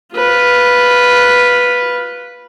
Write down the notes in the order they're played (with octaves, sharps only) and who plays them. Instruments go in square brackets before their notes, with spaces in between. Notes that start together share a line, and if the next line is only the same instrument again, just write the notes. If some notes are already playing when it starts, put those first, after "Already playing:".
[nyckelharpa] F4 B4